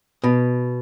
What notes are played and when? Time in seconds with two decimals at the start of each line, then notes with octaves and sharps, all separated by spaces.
0.24 B2